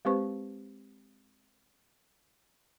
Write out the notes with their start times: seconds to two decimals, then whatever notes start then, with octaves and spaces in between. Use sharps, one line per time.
0.05 G#3 C4 G4 B4 C5 C#6